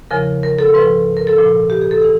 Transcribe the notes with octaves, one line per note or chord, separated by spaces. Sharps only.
E2 C#3 F3 A#4
A#4
A4
G#2 F3 B4
A#4
A4
A#2 F3
G4
G#4
A4
E3 G#4